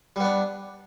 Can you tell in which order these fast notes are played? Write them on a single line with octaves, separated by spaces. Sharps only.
G3 B3 D4